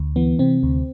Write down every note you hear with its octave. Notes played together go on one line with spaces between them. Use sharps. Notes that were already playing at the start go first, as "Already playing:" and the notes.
Already playing: D2
E3 B3
C3 C4
D2